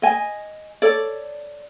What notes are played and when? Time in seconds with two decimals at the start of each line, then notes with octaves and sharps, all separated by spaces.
0.02 D#5 G#5
0.82 A4 C#5 D5